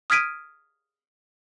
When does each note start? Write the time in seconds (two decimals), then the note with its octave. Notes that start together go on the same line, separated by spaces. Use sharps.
0.10 D#6 F6 G#6 B6 D7 D#7